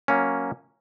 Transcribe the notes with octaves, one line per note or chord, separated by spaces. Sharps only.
F#3 A#3 C#4